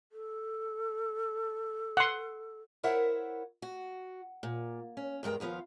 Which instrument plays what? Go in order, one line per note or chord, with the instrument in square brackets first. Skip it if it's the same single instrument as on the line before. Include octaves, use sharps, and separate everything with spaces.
[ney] A4
[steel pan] F#5 C6
[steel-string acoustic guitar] E4 A#4 C5 C#5 E5 F#5
F#4
A#2
C#4
E2 G2 G#3 A#4 G5
D#2 F3 B3 F4 F5